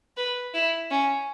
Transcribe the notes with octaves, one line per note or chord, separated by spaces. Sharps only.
B4
E4
C#4